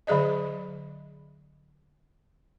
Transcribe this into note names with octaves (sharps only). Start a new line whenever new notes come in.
D3 F#3 G#4 D5 D#5